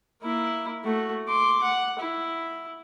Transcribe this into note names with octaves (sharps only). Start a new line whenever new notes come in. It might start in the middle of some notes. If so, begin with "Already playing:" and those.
A#3 E4
A3 F#4
C6 D6
F#5
E4